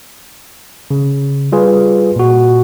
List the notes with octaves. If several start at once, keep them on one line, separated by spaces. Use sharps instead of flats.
C#3
G3 F4 G#4 B4
A#2 F#4